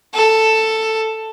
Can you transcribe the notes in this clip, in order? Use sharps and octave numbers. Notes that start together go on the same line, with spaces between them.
A4